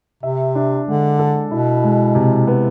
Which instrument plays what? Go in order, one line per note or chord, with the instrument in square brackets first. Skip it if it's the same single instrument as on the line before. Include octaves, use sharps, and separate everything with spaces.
[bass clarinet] C3 [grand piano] E5
[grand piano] D4
[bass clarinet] D3 [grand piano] G#3
[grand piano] A4
[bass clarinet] B2 [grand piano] E4
[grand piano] G#3
C3
B3